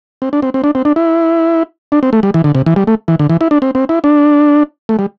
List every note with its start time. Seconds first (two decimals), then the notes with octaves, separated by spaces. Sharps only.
0.22 C4
0.33 D4
0.42 C4
0.54 C4
0.64 D4
0.75 C4
0.85 D4
0.96 E4
1.92 D4
2.03 C4
2.13 A3
2.23 G3
2.34 E3
2.44 D3
2.55 C3
2.66 E3
2.76 G3
2.87 A3
3.08 E3
3.19 D3
3.30 E3
3.41 E4
3.51 D4
3.62 C4
3.75 C4
3.89 E4
4.04 D4
4.89 A3
4.99 G3